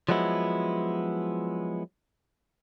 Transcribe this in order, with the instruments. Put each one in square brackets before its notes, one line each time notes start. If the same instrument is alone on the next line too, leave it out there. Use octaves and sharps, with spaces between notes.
[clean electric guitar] F3 F#3 G#3 B3 E4